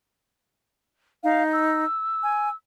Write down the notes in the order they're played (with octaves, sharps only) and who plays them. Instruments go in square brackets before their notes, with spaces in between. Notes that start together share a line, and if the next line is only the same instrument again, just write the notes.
[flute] D#4 [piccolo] F5
[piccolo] E6
[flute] G#5